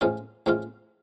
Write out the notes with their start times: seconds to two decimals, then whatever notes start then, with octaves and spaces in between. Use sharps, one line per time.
0.01 A2 F3 G#3 C#4 F4
0.46 A2 F3 G#3 C#4 F4